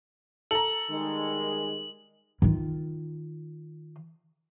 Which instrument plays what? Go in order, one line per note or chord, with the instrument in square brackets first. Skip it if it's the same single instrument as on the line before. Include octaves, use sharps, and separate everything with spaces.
[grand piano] A4 A#5 [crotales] F#7
[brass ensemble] D#3 G3 G#3
[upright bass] D#3 F4